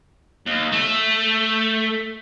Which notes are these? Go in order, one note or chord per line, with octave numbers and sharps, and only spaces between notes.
D#2
A3